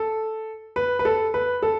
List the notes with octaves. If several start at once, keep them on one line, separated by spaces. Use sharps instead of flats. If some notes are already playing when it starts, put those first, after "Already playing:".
Already playing: A4
B4
B4
A4
B4
A4